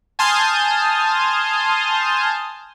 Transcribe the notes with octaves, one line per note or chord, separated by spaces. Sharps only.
G#5 A5 C6 D#6 F6 G6